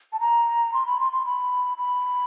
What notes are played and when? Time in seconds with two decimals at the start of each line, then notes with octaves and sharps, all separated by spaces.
0.13 A5
0.20 A#5
0.74 C6
0.86 B5
1.00 C6
1.13 C6
1.26 B5
1.78 B5